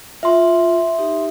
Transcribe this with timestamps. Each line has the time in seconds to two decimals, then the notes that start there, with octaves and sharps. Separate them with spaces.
0.23 F4 E5 C6
0.98 D#4 G4